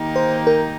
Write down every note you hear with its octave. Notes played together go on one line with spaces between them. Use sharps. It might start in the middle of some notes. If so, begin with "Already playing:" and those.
Already playing: D#3 A#3 D#4 G4
C5
A#4